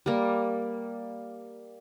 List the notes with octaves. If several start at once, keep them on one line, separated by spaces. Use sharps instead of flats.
G3 A#3